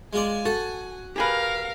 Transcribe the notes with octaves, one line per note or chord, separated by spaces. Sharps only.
G#3 F4 D5 G#5
F#4 A4 F#5
G4 G#4 A#4 B4 F5